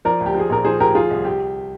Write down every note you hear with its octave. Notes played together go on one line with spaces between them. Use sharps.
F3 A#4 D5
D2
G4
F3 G#4
A#1 A#4
F3 G#4 C5
D2 G4 A#4
F3 F4 G#4
C2
G4